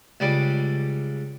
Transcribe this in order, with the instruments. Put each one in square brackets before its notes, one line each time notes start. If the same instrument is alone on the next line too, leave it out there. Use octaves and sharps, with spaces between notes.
[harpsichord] C#2 G3 D5